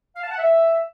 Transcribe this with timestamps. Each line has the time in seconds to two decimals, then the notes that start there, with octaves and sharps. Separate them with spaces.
0.16 F5
0.23 A5
0.31 F#5
0.38 E5